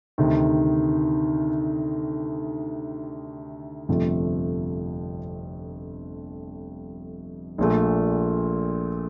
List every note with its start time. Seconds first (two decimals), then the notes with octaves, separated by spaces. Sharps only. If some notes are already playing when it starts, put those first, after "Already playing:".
0.18 D2 C3 D#3
3.89 G1 F2 C3 F3 A3
7.58 A#1 A#2 A3